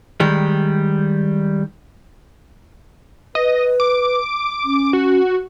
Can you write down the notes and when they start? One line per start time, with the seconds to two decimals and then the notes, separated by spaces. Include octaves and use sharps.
0.20 D#3 G3 G#3
3.35 B4 D#5
3.80 D6
4.65 C#4
4.93 F#4